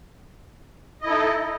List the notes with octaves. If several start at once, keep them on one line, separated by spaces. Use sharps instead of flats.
D#4 E4 A4 D#5